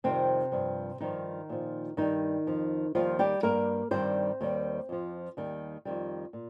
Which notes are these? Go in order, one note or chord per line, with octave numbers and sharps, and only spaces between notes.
F2 C3 D#3 G3 C4
G2 F3
G2 D#3 F3 D#4
A#2 F3
G2 D#3 G3 D#4
F2 F3
D#2 D#3 F3 G3 F4
G3 G4
G2 G3 A#3 A#4
G2 D#3 G3 C4 C5
D#2 D#3 G3
F2 F3
D#2 D#3 G3
F2 D#3 G3
A#2